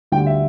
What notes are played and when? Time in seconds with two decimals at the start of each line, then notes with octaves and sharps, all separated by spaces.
0.12 D2 D3 G3 G5
0.27 E5